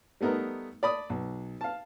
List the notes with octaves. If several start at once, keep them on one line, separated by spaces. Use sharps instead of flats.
G3 A3 B3 D#4 A#4
D5 B5 D#6
B1
F5 A5